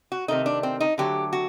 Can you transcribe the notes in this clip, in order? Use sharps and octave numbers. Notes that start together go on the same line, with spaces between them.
F#4
C3 D#3 A3 D#4
D4
C4
D#4
D3 F#3 A3 G4
F#4